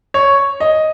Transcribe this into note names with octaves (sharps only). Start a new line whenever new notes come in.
C#5
D#5